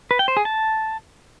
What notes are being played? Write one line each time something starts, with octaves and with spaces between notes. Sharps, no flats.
B4
G5
C5
G#4
A5